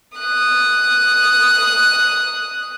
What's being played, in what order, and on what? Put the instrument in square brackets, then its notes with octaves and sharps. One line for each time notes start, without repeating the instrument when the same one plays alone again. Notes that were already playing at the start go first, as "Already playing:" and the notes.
[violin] D#6 F#6